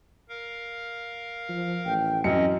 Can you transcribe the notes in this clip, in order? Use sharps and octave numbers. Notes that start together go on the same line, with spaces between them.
A#4 F5
F3
A1 G5
F#2 C4 C#4 D#5 A#6 C#7